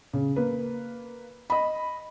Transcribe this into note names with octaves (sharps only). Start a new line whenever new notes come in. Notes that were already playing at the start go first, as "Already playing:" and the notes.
C#3
A#3 B4
D#5 B5